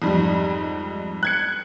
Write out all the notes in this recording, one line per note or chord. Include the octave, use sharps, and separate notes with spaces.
F2 G#2 G3
F#6 G#6 C#7